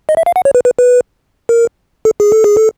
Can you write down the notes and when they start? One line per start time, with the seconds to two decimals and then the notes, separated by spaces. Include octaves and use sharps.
0.09 D#5
0.17 E5
0.26 F5
0.36 F#5
0.45 C#5
0.55 B4
0.65 B4
0.79 B4
1.49 A#4
2.05 A4
2.20 G#4
2.32 A4
2.44 G#4
2.57 A4